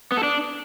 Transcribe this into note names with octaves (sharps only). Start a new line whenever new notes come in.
B3
A4
D4